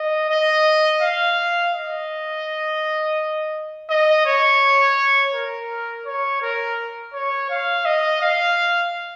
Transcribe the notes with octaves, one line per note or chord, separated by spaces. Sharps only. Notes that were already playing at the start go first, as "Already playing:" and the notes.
Already playing: D#5
D#5
F5
D#5
D#5
C#5
A#4
C#5
A#4
C#5
F5
D#5
F5